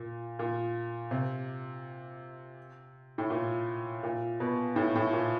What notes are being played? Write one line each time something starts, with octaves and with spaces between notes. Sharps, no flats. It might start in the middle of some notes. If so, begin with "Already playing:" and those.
Already playing: A#2
A#2
C3
A2
A#2
A#2
B2
A2
A2
A#2